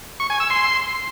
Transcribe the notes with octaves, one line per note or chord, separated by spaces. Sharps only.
C#6
G#5
E6
C6